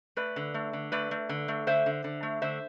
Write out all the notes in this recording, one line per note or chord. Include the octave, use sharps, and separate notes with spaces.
A3 B4 D5
D3
A3
D3
A3 B4 D5
A3
D3
A3
D3 C5 E5
D3
D3
A3
D3 C5 E5